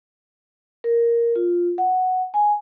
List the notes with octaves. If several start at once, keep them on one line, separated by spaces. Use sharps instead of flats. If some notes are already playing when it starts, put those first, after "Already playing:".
A#4
F4
F#5
G#5